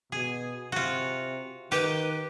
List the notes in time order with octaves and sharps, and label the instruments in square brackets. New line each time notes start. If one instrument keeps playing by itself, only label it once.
[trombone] B2 [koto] G#4
[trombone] C3 [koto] F4 F#4
[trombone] D#3 [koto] G4 [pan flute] B4